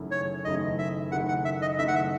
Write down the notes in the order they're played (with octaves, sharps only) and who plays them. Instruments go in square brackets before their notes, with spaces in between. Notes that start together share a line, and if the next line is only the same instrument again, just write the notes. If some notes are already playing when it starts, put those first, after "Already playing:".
Already playing: [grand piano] F#1 F#2 D#3 A3 E4
[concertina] C#5
[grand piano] F#1 F#2 D#3 A3 E4 [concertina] D#5
[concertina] E5
[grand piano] F#1 F#2 D#3 A3 E4 [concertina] F#5
[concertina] F#5
E5
D#5
[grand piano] F#1 F#2 D#3 A3 E4 [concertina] E5
[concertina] F#5
E5